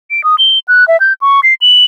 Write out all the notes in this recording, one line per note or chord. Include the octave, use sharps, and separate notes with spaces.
D7
D#6
G7
F#6
E5
G6
C#6
C7
F#7